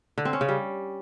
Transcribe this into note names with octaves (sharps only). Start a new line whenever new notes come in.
D3
C4
C#4
C#3
G3